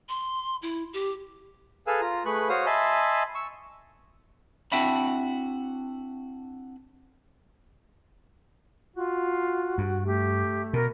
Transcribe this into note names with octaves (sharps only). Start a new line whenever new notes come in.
C6
E4
G4
G#4 A4 B4 F5 G#5 E6
F4 A#5
A3 G#4 B4 B5 C#6 F#6
F#4 C5 C#5 F5 D#6
D#5 E5 G#5 A5 B5 C6
C#6 E6
C4 D4 E4 F#4 E5 B5
F4 F#4
G2
A3 G4
B2 A#4